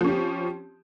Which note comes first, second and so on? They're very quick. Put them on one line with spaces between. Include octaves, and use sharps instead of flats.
F3 C#4 G4 C4